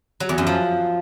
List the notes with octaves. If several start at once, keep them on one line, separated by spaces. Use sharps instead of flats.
F#3
E2
F#2
F3